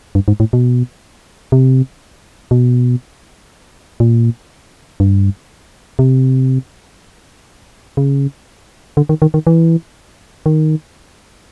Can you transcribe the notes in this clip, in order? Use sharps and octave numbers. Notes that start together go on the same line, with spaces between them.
G2
G#2
A2
B2
C3
B2
A#2
G2
C3
C#3
D3
D#3
D#3
D#3
E3
D#3